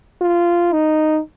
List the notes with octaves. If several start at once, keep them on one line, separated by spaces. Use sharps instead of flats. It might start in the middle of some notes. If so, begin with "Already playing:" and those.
F4
D#4